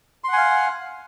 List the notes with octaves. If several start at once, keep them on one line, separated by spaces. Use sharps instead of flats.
F5 F#5 G#5 C6